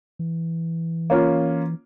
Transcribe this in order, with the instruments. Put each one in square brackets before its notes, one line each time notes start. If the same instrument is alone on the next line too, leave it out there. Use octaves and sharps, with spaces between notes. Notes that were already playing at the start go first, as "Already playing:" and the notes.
[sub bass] E3
[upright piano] A#3 C#4 F4